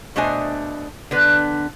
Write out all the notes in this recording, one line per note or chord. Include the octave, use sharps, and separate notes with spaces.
B2 A3 D4 C5 D#5 G#5
D3 B3 B4